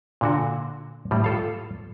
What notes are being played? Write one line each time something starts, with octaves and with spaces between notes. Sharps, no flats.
A#2 D3 F#4
A2 G3
F4 A4 F5